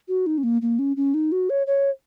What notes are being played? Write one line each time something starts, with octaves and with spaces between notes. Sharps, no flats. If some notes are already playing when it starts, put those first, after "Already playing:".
F#4
D#4
C#4
A#3
A#3
C#4
C#4
D#4
F#4
C#5
C#5